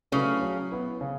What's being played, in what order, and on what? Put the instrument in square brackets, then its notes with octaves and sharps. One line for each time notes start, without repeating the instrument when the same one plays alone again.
[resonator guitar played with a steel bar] C#3 C#4 [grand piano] F#3 A3 E4 B4
[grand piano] F#3
B3 E4 B4
C#3